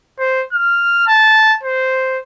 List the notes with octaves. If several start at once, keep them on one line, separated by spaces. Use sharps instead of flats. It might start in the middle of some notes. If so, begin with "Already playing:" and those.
C5
F6
A5
C5